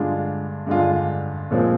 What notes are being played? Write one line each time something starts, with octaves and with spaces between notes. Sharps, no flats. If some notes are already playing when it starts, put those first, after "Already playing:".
Already playing: G2 D3 G#3 D4 F4
G2 D3 G#3 D4 F4
A#2 F3 G#3 C4